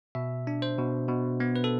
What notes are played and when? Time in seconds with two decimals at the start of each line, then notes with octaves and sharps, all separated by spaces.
0.15 B2 E5
0.47 D4
0.62 C5
0.78 B2
1.08 B2
1.40 B3
1.56 B4
1.64 A4